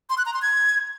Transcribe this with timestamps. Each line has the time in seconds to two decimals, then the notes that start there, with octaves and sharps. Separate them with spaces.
0.10 C6
0.18 F#6
0.26 A#5
0.34 C6
0.42 G#6